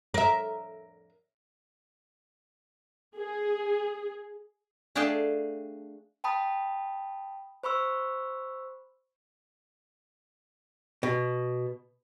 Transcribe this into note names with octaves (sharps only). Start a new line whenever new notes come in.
A#4 E5
G#4
A3 D4 G#4 F5 G5 A5
G5 A5 B5 D#6
C5 B5 C#6 E6
B2